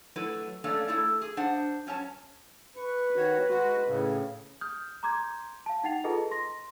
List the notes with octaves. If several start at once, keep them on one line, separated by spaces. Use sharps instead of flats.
F#3 A3 E4 B4
A3 A#3 C#4 D4 A4 C#5
A3 E4 A4
G#4
D4 C5 F#5
F#3 C#4 C#5 A5
B4 C#6
D#3 F#4 C#5
G#3 F#4
A2 C#3
D#6 F6 G6
A#5 C6 D6 G6 G#6
F5 A5
D#4 F#5 G5 A6 C7 F7
F4 G#4 A4 B4 D#5 A5
C6 A#6